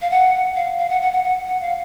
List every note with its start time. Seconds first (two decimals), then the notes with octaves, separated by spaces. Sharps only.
0.02 F5
0.11 F#5
0.56 F5
0.79 F5
0.89 F#5
1.02 F#5
1.13 F#5
1.24 F#5
1.47 F#5
1.61 F5